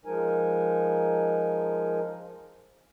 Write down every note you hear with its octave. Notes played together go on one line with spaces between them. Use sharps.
F3 G#3 D#4 A#4 G#5